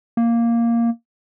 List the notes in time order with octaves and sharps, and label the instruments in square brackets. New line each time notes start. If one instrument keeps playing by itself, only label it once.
[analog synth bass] A#3